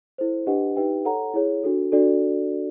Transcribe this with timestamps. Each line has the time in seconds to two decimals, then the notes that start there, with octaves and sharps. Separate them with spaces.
0.18 E4 A4 C5
0.47 D4 G4 B4 D#5 F#5
0.76 D#4 G4 B4 E5 G5
1.05 A4 C#5 F#5 A#5
1.34 E4 G#4 C#5
1.64 D4 F#4 A4
1.92 D4 F#4 A4 D5